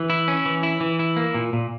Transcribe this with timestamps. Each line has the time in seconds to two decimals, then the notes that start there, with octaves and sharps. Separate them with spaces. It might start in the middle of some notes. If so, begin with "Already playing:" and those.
Already playing: E3
0.10 E4
0.28 C#4
0.46 E3
0.63 E4
0.81 E3
0.99 E4
1.17 A#3
1.34 A#2
1.53 A#2